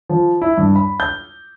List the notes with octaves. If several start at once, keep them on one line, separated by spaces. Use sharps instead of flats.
F3
E4
G2
B5
G6